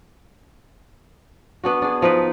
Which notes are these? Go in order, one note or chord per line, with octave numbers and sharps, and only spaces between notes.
B3 D4 F#4
D4 G#4
F3 D#4 B4